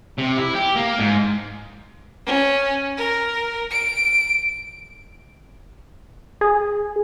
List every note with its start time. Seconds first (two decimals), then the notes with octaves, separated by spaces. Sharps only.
0.19 C3
0.38 E4
0.56 G4
0.76 A#3
1.00 G#2
2.26 C#4
2.97 A#4
3.71 D7
6.41 G#4